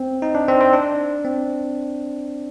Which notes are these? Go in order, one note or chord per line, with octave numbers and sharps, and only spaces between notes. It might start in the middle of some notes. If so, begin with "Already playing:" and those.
Already playing: C4
D#4
D4
C4
C4
D4
C4